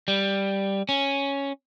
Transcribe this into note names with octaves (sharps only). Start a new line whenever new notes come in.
G3
C#4